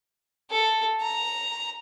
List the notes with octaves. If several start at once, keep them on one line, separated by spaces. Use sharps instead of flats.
A4
A#5